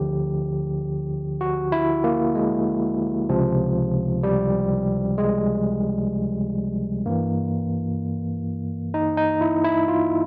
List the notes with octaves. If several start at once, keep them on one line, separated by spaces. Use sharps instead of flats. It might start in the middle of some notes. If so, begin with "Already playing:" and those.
Already playing: D2 D3 F3 G4
F#4
E4
A#3
G#3
C#2 C3 F3
G3
G#3
G2 E3 A#3
D#4
D#4
E4
E4
F4